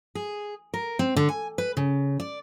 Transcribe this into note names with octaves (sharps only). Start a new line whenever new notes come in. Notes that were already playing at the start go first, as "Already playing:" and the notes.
G#4
A#4
C4
D3
G#5
B4
C#3
D5